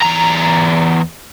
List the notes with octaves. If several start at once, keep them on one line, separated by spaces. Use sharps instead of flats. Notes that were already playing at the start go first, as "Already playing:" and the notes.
E2 A#5